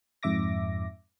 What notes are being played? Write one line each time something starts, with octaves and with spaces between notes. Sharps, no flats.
F2 G#2 E5 D6 A#6